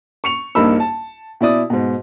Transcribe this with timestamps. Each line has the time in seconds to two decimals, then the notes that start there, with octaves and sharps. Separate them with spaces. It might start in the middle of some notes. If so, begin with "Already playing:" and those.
0.24 C#6 C#7 F7
0.55 A#1 G2 A#3 D#4 B5 E6
0.80 A5
1.41 B2 E4 D5 D#6
1.70 G#2 B2